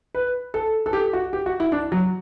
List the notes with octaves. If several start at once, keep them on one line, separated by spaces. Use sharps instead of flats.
B4
A4
A4
G4
F#4
G4
F#4
E4
D4
F#3